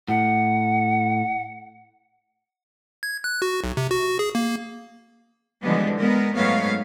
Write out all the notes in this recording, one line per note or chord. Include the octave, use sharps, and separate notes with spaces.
A2 F#5
G#6
F#6
F#4
B1
C3
F#4
G#4
A#3
D3 E3 F3 G3 G#3 B3
G#3 B3 A#4
G#2 F#3 A3 B3 C#5 F5